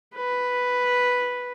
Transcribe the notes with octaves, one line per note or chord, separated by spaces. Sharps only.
B4